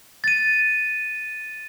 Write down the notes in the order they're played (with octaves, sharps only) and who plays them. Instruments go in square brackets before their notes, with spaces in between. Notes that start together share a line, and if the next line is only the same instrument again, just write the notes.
[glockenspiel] A6 D#7